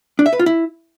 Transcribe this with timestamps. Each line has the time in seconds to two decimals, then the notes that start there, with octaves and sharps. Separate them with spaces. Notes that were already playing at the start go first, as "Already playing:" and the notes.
0.19 D4
0.26 E5
0.33 B4
0.39 F4
0.46 E4